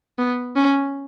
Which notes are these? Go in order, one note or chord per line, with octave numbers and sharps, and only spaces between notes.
B3
C#4